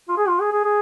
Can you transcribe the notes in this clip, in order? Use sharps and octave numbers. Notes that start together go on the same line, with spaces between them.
F4
G#4
F4
G#4
G#4
G#4